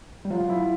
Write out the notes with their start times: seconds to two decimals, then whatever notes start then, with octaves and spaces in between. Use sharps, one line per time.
0.25 G3
0.30 F#3 F4
0.50 E4